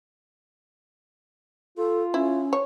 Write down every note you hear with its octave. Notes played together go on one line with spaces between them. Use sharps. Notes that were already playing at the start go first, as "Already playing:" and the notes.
F4 A4
C#4 E4
C#5